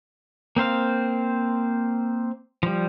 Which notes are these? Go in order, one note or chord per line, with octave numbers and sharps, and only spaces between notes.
A#3 C4 C5 F5
F3 G3